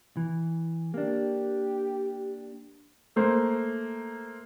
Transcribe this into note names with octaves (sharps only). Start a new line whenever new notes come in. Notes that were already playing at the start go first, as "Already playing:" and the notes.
E3
A#3 D4 G4
A3 A#3 C5